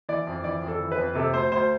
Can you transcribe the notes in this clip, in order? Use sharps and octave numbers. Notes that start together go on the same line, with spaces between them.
E3 D5
F2
E3 D5
F2
A4
E3
B4
F2
C3 A4
D2 C5
D2 C5